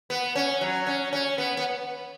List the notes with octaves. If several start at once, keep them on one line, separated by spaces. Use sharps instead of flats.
B3
C#4
F#3
C#4
C#4
B3
B3